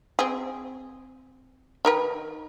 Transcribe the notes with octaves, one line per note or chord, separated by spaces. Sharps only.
C4 G#4
D#3 A#4 B4